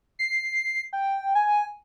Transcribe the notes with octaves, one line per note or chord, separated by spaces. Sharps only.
C7
G5
G#5